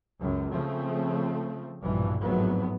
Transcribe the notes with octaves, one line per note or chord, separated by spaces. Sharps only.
C#2 F#2 F#3
C#3 F3 A3 C4
A#1 G2 B2 E3
G#1 F2 A2 F#3 B3